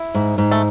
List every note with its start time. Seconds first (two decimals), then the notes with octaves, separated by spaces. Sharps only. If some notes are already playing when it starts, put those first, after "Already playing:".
Already playing: E4
0.15 G#2
0.38 G#2
0.51 A3